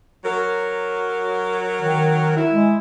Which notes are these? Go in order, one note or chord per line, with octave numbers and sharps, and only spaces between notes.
F#3 A#4
D#3
E4
G#3